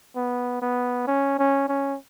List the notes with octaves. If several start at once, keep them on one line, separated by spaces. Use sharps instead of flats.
B3
B3
C#4
C#4
C#4